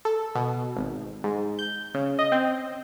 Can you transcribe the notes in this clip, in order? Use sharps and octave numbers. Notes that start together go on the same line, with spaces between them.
A4
B2
G#1
G#2
G6
C#3
D#5
C4